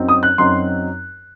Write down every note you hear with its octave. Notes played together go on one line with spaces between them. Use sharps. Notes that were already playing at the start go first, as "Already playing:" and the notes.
Already playing: F#2 F#3 C4 D#4
D#6
F#6
F#2 F#3 C4 D#4 C6